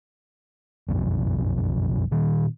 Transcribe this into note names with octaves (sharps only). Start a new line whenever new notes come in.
F#1 B1 F2
A#2 D#3